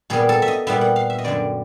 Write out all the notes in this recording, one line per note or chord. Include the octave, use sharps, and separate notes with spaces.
A#2 G3 B3 G#4
A4
E5
D#5
A#2 G3 B3 E5
F#5
F5
E5
D#5
F#2 D3 G3 D5